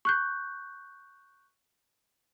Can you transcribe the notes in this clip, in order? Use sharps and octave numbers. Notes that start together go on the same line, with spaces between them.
C#6 F#6 G6